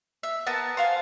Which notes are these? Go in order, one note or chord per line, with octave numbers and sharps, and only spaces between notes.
E5
B3 A#4 A5
C5 F5 G#5